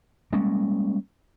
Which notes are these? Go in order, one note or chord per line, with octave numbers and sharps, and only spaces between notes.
G3 G#3 A#3 C#4